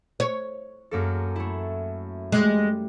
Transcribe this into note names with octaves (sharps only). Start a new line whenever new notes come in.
C#5
F#2 A#3 A4
A3 E4
G3 G#3